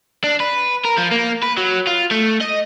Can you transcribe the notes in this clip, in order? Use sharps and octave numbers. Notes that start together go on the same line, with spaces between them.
D4
B4
A#4
F3
A#3
B4
F#3
F4
A3
D#5